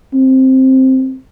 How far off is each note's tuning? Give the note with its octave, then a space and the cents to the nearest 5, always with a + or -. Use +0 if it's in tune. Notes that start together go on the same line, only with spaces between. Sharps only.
C4 +5